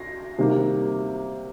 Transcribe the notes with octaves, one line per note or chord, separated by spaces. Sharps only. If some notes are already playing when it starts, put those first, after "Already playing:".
Already playing: A#6 C7
C3 D#3 G3 A#3